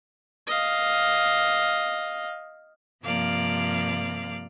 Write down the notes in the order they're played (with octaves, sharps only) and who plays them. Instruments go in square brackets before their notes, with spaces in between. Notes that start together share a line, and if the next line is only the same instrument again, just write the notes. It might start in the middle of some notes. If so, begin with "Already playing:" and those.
[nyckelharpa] D#5 F5
[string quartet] G2 C3 F3 A#3 D5 F5